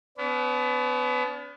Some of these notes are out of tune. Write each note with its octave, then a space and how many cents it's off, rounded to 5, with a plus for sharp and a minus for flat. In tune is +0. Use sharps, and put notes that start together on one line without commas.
B3 +25 D4 -45